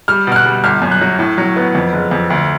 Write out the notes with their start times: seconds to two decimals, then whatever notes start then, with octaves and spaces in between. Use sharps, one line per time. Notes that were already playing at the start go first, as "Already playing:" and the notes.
0.08 G3 F6
0.27 B2 F6
0.36 F#6
0.46 G3
0.64 G1 F6
0.82 F#2
0.92 F#6
1.01 F#3
1.19 A2
1.38 F#3
1.56 B3
1.75 F2
1.93 F#1
2.11 F2
2.30 D2